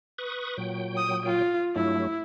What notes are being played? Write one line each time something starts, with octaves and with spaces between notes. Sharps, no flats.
B4 C#6 D#6
A#2 F#3 G5
D#6
F4
G2 F#3 A3 E4